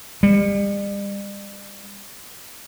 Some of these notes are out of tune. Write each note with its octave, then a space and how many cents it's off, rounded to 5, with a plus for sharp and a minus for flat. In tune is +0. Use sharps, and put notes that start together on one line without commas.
G3 +40